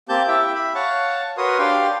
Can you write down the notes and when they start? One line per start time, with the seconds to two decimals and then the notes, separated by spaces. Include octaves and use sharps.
0.09 A#3 C4 G4 A5 G6
0.28 E4 G4 E5 G5
0.55 E5 B5
0.75 C#5 F5 F#5 A5 C#6
1.37 F#4 A#4 B4 C#5 C6 D#6
1.59 D4 G4 F5 G5 C6